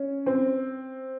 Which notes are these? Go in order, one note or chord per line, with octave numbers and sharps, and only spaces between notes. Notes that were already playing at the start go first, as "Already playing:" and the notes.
Already playing: C#4
C4